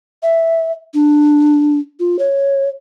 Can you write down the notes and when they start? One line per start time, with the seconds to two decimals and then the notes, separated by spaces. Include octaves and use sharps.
0.23 E5
0.94 D4
2.00 F4
2.19 C#5